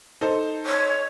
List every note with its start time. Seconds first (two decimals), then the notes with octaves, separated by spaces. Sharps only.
0.21 D#4 A4 C5
0.66 C#5